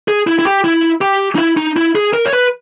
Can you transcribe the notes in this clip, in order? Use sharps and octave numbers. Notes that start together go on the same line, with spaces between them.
G#4
E4
E4
G4
E4
G4
D#4
E4
D#4
E4
G#4
A#4
C#5
B4